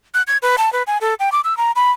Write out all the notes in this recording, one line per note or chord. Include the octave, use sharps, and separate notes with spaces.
F#6
G#6
B4
A5
B4
G#5
A4
G5
D6
E6
A#5
B5